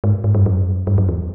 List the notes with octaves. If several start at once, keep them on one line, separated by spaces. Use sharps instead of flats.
G#2
G#2
G2
F#2
G2
F#2
E2